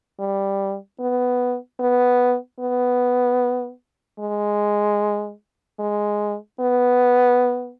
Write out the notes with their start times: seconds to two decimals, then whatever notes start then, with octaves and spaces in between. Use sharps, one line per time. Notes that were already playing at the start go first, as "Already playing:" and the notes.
0.20 G3
1.00 B3
1.80 B3
2.60 B3
4.20 G#3
5.80 G#3
6.60 B3